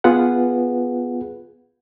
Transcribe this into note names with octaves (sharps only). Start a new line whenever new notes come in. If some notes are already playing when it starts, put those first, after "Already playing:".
B3 F4 G#4 B4 F#5